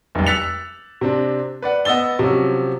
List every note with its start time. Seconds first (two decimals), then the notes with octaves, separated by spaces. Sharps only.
0.15 F1 C2
0.27 E6 F#6 A6 B6 C#7 F7
1.01 C3 C4 D4
1.62 B4 D5 F#5
1.85 B3 D#5 E6 A6 G7
2.19 C3 F3 F#3 C#4